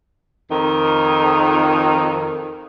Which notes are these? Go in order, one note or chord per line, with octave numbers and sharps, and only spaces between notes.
F2 D#3